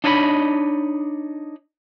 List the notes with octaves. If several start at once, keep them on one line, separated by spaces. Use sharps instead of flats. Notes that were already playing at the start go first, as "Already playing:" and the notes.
D4 D#4 C#5 D#5 F#5 B5